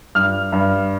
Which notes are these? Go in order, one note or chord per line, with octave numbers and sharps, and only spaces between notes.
G2 F6
G2